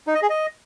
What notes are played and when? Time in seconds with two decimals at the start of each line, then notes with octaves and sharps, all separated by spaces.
0.07 D#4
0.15 D#5
0.22 G#4
0.30 D#5